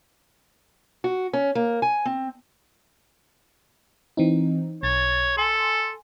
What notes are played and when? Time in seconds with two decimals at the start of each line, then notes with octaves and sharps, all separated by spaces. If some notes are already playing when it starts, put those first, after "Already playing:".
1.04 F#4
1.33 C#4
1.55 A#3
1.82 G#5
2.05 C4
4.17 E3 C4 D#4
4.83 B1 C#5 A6
5.37 A4 G#5 C6